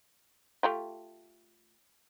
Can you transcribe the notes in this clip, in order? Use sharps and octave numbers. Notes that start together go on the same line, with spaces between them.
A3 F4 G4